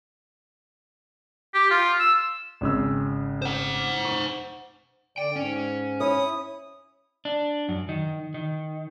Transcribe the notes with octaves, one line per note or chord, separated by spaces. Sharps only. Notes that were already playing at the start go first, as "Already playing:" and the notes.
G4
F4
E6
G#1 C#3 E6
C5 F#5
C#6
D3 D5 G5
G#2 C#4
E4 C#5 D#6
D4
F#2
D#3
D#3